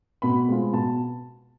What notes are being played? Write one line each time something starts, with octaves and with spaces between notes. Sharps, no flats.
B2 B5
G#3 C4 F4
B2 A5